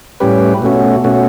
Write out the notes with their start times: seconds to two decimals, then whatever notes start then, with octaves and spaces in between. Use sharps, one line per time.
0.20 A2 G3 C#4 G4 B4
0.62 B2 A3 C#4 F#4
1.04 B2 A3 C#4 F#4